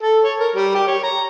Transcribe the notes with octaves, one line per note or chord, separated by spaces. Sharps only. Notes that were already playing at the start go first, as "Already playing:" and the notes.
A4
C#5
A#4
G3
G4
C#5
A#5